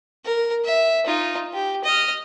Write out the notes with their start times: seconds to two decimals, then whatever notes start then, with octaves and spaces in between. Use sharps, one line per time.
0.25 A#4
0.65 E5
1.06 D#4 F4
1.54 G4
1.85 D#5 F6